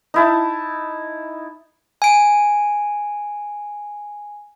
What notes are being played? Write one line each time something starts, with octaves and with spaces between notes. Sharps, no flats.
D#4 E4 A5
G#5 D7